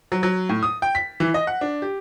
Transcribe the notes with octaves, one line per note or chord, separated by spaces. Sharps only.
F#3
F#3
A2
D#6
G5
B6
E3
D#5
F#5
D4
G4